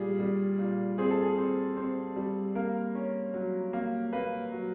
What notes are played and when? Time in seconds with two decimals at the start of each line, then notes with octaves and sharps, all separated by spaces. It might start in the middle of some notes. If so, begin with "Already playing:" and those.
Already playing: A#2 G3 G#4
0.19 G3
0.59 A#2
0.98 C4 G#4
1.11 A4
1.23 G#4
1.38 C4
1.77 C4
2.16 G3
2.55 A#3 A#4
2.95 C#4
3.34 F#3
3.73 A#3
4.12 A#3 B4
4.52 F#3